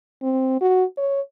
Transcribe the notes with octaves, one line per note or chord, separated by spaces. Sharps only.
C4
F#4
C#5